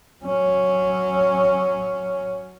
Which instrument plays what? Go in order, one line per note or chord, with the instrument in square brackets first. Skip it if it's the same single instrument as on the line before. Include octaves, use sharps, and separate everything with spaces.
[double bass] F#3 C#4